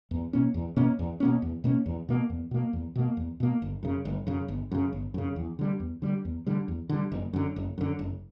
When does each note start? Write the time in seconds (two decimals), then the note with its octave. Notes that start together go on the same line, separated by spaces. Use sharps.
0.11 E2
0.33 B2 A#3 C#4
0.54 E2
0.76 B2 A#3 C#4
0.99 E2
1.20 B2 A#3 C#4
1.42 E2
1.64 B2 A#3 C#4
1.86 E2
2.09 B2 A#3
2.30 E2
2.51 B2 A#3
2.73 E2
2.96 B2 A#3
3.17 E2
3.40 B2 A#3
3.62 G1
3.83 F#2 C#3
4.05 G1
4.27 F#2 C#3
4.48 G1
4.71 F#2 C#3
4.93 G1
5.14 F#2 C#3
5.36 E2
5.59 D3 G3
5.80 E2
6.02 D3 G3
6.25 E2
6.47 D3 G3
6.68 E2
6.89 D3 G3
7.12 F#1
7.33 F#2 D3
7.56 F#1
7.78 F#2 D3
7.99 F#1